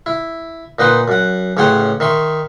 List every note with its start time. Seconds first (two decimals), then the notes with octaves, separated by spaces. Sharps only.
0.06 E4
0.79 A#2 D#4 B4 F#5 C6
1.08 F#2 F#5
1.57 A1 C#3 C#5 F#5 G5 C6
2.00 D#3 E5 C6 C#6